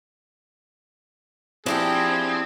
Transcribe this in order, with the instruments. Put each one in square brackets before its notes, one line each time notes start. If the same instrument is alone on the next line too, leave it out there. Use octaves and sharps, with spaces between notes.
[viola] F3 G5 [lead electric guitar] C4 [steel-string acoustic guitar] D4 E4 G4 [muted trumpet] G#4